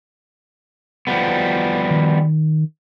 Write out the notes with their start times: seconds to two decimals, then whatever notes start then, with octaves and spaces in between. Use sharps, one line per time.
1.07 F3 G3 B3
1.91 D#3